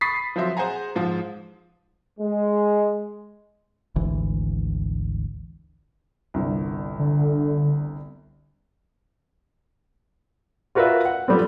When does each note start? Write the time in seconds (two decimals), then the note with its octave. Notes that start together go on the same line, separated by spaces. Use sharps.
0.01 B5 C#6 D#6 A6 B6 C7
0.36 F3 F#3 C4 C5 E5 C6
0.57 G#4 C5 F#5 G#5 A#5
0.95 G#2 F3
2.19 G#3
3.96 G#1 D2 E3
6.34 G1 C2
6.99 D3
10.75 F4 F#4 A#4 B4 D5 E5
11.05 F#5
11.28 F3 G3 A3 B3 C4